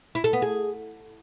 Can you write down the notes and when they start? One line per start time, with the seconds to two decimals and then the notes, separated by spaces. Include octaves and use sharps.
0.15 E4
0.24 A4
0.33 B3
0.42 G#4